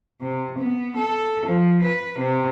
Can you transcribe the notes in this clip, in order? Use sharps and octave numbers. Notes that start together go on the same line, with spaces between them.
C3
B3
A4
F3
B4
C3